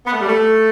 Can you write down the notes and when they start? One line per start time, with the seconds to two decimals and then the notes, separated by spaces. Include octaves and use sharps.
0.05 B3
0.13 A3
0.21 G3
0.29 A3